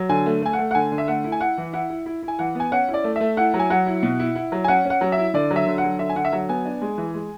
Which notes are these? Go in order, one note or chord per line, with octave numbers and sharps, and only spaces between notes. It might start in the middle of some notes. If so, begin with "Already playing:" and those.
Already playing: F#3
D3 G#5
A3
A3 G#5
F#5
A3
F#5
D3 G#5
D3
E5
A3 F#5
E4
G#5
E4 F#5
E3
E4 F#5
E4
E4
E4
G#5
E3 F#5
B3 G#5
C#4 F#5
E4
D5
A3
A3 E5
E4 F#5
F#3
G#5
F#3 F#5
E4
B2
E4
E4
F#3
G#5
C#4 F#5
C#4 F#5
F#3
E5
E4
D3 D5
F#3
E5
D3
F#5
F#3
D3 E5
G#5
D3 F#5
E5
F#3 F#5
B3 G#5
D4
G#3
E3
G#3